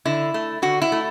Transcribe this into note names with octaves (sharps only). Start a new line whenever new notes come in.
D3 E4
A3
D3 F#4
E4
A3